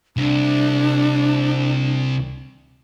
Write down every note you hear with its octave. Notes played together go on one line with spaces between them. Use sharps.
C2 D4